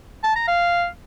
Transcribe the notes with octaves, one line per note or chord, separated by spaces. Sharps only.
A5
A#5
F5